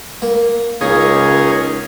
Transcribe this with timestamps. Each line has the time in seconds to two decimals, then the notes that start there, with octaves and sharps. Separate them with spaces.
0.22 A#3
0.81 C#2 A#3 C#4 D#4 G#4